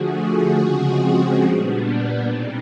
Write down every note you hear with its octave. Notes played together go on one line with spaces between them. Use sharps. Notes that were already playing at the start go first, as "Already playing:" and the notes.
Already playing: D3 F3 A3 F#4 G#4
F#4 G#4
C#3 F3 G#3 C4
A#2 G3 B3 D4
B2 G#3 C4 D#4